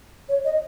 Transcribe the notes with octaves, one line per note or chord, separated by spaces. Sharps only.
C#5
D#5